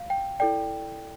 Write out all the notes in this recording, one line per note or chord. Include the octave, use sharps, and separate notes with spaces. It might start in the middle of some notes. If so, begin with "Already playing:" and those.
Already playing: F5
G5
E4 A4 D5 G5